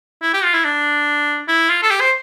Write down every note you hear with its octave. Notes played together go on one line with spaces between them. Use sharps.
E4
G4
F4
E4
D4
E4
F4
A4
G4
C5